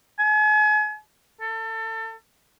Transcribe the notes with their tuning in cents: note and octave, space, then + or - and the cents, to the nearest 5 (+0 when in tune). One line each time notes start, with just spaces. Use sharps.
G#5 +40
A4 +30